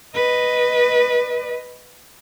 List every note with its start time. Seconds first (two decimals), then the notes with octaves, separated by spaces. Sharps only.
0.14 B4 D#5